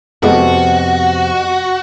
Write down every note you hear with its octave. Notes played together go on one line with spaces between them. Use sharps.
F2 C3 G#3 B3 E4 F#4 A4